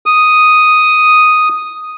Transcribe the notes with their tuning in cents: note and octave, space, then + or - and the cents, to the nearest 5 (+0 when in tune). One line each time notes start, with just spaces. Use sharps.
D#6 +0